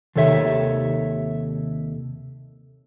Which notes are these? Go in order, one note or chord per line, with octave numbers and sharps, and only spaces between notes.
D#2 C3 D#3 A4 C#5 E5